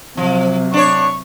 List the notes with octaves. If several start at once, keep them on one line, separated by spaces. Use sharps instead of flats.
C3 F3 F#3
D4 C#5 C#6